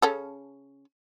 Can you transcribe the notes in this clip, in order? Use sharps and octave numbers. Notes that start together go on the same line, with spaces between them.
C#3 C#4 A4